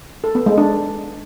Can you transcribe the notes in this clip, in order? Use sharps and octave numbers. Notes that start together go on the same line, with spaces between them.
A4
B3
G#3
D4